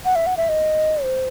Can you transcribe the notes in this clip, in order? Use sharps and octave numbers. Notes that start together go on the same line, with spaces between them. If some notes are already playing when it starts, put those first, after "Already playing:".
F#5
E5
F#5
E5
D#5
C5